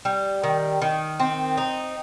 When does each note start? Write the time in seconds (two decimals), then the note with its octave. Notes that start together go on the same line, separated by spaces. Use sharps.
0.05 G3
0.43 D#3
0.82 D#3
1.19 C4
1.57 D#4